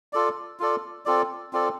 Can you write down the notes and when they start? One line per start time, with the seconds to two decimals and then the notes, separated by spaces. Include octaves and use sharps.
0.13 F4 A4 D5
0.60 F4 A4 D5
1.05 C4 F4 A4 D5
1.53 C4 F4 A4 D5